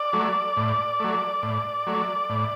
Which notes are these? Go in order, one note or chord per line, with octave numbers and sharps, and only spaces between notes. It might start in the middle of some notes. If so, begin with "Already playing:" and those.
Already playing: D5
F#3 A3
A2
F#3 A3
A2
F#3 A3
A2